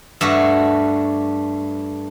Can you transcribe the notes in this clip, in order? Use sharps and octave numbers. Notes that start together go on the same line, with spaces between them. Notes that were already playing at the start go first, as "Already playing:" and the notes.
G2 A3 F#4